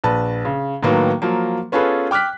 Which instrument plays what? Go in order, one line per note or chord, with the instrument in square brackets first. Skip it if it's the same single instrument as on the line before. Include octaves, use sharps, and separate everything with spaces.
[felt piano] A#1 B4 A5
C#3
A2 D#3 F#3 A#3 B3
F3 F#3 A#3
B3 C#4 F4 G#4 A4 B4
G5 D6 F6 F#6 B6